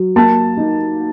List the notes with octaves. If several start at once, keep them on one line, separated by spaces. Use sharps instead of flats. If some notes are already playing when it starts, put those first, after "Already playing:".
Already playing: F#3
A#3 A5
D#4